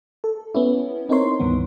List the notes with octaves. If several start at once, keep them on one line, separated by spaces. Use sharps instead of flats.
A4
B3 C#4 E4
C4 D#4 E4 A#4 C#5 C6
C#2 G2 D#3 E3 B3